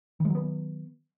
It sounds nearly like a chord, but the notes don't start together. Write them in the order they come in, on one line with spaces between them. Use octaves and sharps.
D#3 G#3 F#3 B3